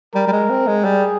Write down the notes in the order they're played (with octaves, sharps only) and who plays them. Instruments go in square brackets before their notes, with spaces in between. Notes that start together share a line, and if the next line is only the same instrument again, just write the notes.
[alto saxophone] G3 [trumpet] A#4
[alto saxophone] G3
G#3
C4
G#3
[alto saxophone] G3 [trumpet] G#4